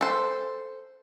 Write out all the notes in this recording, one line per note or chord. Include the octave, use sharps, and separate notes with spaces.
A4 C5